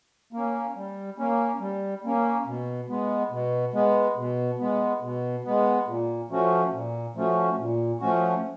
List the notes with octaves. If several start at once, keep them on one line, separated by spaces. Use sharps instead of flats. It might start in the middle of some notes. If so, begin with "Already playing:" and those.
A#3 C#4
G3
A#3 C#4
G3
A#3 C#4
B2
G#3 B3
B2
G#3 B3
B2
G#3 B3
B2
G#3 B3
A#2
F3 A3 C#4 F#4
A#2
F3 A3 C#4 F#4
A#2
F3 A3 C#4 F#4